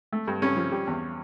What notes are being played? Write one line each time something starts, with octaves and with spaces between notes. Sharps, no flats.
A3
G2
G2 C#4
F3
G3
E2